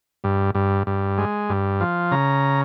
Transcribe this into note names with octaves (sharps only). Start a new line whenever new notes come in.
G2
G2
G2
G#3
G2
F3
C#3 A#5